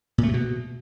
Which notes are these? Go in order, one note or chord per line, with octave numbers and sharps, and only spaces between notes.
A#2
A3
C3
B2